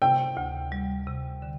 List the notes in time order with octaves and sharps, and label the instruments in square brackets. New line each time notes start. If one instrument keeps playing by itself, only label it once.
[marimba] C3 [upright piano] G5
[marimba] D2
G3
C3
D3